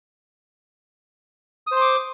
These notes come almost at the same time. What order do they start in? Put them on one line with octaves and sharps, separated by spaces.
D#6 C5 C6 D6